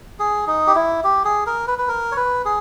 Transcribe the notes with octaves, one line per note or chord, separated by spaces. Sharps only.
G#4
D#4
G4
E4
G4
G#4
A#4
B4
B4
A#4
C#5
B4
G#4